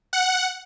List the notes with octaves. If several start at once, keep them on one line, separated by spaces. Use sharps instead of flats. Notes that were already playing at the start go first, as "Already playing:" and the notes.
F#5